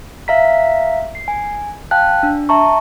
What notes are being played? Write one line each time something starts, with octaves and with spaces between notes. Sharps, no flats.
E5 F5 A#5 B6
C7
G#5
F5 G5 A5 F#6
D4
E5 A5 A#5 C#6